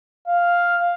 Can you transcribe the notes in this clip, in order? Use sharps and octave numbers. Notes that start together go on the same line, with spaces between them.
F5